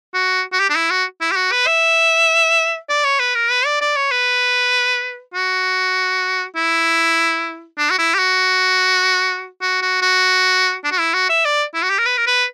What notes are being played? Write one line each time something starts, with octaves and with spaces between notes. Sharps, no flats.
F#4
F#4
G4
D4
E4
F#4
E4
G4
F#4
B4
E5
D5
C#5
B4
A#4
B4
D5
D5
C#5
B4
F#4
E4
D4
F#4
E4
G4
F#4
F#4
F#4
F#4
D4
F#4
E4
F#4
E5
D5
E4
F#4
G4
A#4
B4
A#4
B4